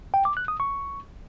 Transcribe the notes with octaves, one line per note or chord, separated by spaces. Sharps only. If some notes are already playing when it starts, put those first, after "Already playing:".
G5
D6
F#6
D#6
C#6